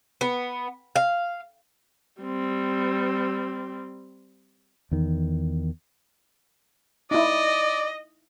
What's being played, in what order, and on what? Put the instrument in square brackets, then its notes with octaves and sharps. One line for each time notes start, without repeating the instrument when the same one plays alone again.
[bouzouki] B3
F5
[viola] G3 C4
[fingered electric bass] E2 D#3
[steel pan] D#4 E4 [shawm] D5 [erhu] D#5